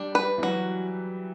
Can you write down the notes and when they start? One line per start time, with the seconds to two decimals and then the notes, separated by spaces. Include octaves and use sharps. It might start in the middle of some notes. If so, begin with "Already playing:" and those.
Already playing: G3 D4
0.15 B4
0.38 E3
0.43 F#3 F#4